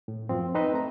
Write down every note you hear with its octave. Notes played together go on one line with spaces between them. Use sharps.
A2
F#2 F3 C4
C4 D#4 B4 C5 D#5
A3 A#5